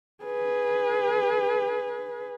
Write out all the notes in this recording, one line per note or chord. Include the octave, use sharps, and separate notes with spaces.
G#4 B4